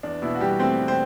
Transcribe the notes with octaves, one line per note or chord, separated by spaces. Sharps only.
E2 D4
B2 E4
F#4
E2 G3 G4
A3 C4 C5
E2
C4 C5